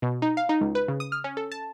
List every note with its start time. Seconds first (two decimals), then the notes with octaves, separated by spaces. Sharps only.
0.02 B2
0.22 D#4
0.37 F5
0.49 D#4
0.61 C#2
0.75 B4
0.88 C#3
1.00 D#6
1.12 F6
1.24 C#4
1.37 A4
1.52 A5